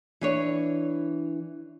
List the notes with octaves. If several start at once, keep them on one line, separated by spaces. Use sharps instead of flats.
E3 D4 C#5